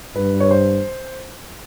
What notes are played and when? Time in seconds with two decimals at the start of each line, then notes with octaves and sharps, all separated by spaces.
0.16 G2 B4
0.40 C#5
0.51 C5